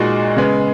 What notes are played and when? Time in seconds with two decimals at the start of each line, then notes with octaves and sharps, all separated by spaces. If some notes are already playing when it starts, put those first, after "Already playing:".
Already playing: A#2 G#3 D#4 F#4
0.36 C#3 G#3 B3